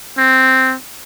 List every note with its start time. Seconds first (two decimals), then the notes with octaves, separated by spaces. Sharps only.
0.18 C4